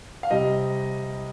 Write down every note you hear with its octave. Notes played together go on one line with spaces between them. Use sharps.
F5
C3 G3 D#5